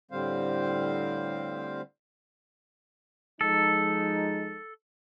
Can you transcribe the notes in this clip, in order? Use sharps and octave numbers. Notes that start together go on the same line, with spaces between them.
A2 D3 G3 C4 C5 F5
F3 G#3 D#4 A4